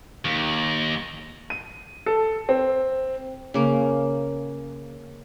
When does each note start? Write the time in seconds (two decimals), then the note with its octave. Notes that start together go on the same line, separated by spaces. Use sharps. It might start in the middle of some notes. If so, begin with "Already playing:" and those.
0.25 D#2
1.50 D#7
2.06 A4
2.49 C4
3.54 C#3 A#3